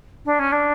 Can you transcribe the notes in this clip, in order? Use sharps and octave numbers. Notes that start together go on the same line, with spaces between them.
D4
C#4
D4